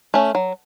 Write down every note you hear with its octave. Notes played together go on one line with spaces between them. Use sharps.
A3 C#4
F#3